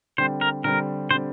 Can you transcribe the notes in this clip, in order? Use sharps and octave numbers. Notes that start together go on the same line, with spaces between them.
D3 G3 C4 C5
A#4
D3 G3 C4 A#4
D3 G3 C4 C5